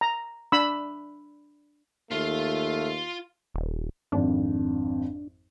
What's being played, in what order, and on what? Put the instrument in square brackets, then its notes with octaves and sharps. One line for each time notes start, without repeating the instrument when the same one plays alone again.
[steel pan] A#5
D4 B5 E6
[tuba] D#2 [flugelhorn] A3 [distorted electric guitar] F4 F5
[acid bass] D#1
[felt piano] G#1 F2 [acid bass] D4